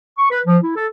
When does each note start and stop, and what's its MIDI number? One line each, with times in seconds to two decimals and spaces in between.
0.18 0.30 85
0.30 0.41 71
0.47 0.57 53
0.63 0.73 64
0.76 0.86 69